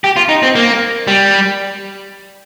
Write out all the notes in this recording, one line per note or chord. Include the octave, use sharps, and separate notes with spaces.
G4
F4
D#4
C4
A#3
G3